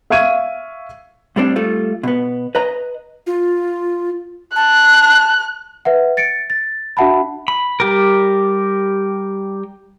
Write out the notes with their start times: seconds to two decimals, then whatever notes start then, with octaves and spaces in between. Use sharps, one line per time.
0.10 E5 F5 C#6 G#6 D#7
1.36 A2 G3 C4 D4
1.56 G3 A3 F4
2.03 B2 B3
2.55 B4 D#5 A#5
3.27 F4
4.56 A5 F#6
5.85 B4 E5 F#5
6.17 A6 C#7 D7
6.50 A6
6.97 D4 F#4 E5 F#5 A5 B5
7.48 B5
7.80 G3 G4 A#4